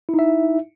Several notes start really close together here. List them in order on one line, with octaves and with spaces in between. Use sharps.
E4 D#4 E5